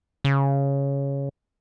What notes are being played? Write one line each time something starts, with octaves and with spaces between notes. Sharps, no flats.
C#3